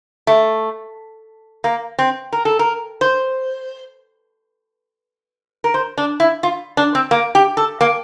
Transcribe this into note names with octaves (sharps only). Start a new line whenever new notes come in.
A3
A#3
C4
A#4
A4
A#4
C5
A#4
C5
D4
E4
F4
D4
C4
A#3
G4
A4
A#3